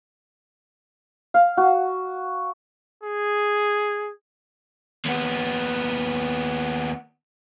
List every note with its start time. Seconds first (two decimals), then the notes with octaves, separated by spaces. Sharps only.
1.34 F5
1.57 F#4
3.03 G#4
5.05 D#2 B3